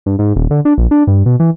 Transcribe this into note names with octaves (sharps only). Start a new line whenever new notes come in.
G2
G#2
D#1
D3
D4
A#1
D4
G2
B2
E3